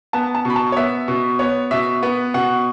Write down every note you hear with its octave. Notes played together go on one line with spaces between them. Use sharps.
B3 A5
A5
B2 B5
A5
C#5
B3 E5
B2
B3 C#5
B2 E5
B3 B4
B2 F#5